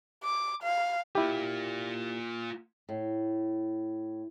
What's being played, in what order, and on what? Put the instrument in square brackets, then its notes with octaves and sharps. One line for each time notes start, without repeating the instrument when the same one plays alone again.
[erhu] D6
F5
[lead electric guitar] A#3 F4 [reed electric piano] E4 G4
[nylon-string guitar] A2